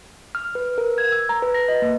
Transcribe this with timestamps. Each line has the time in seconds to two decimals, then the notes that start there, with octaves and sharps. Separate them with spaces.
0.35 F6
0.55 B4
0.78 A#4
0.98 G#6
1.12 E6
1.29 A#5
1.42 B4
1.54 A#6
1.68 D#5
1.82 A#3